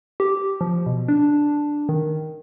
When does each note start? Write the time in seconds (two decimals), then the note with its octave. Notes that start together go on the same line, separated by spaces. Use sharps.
0.20 G4
0.61 F3
0.86 B2
1.08 D4
1.89 D#3